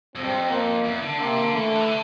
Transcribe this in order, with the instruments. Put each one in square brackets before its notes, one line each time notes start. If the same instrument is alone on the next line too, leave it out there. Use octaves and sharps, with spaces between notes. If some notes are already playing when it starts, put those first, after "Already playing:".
[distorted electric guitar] F2 [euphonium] C4
[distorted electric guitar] G2
F2
[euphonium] A#3
[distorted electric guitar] E2
D3
[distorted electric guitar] C3 [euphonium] A#3
[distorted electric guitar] D3
[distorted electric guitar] E3 [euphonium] A3
[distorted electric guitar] D3
E3
D3